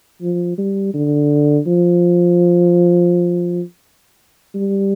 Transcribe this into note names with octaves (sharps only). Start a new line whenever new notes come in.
F3
G3
D3
F3
G3